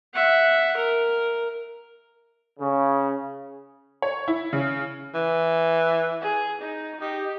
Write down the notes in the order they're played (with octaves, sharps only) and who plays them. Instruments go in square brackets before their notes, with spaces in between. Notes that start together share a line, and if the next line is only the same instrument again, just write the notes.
[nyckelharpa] E5 F#5
A#4
[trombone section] C#3
[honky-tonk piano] C#5
E4
C#3
[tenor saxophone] E3
[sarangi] G#4
D#4
[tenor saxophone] D#4 [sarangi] G4